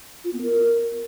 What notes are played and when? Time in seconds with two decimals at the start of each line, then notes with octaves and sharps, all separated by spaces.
0.25 F4
0.33 B3
0.42 A#4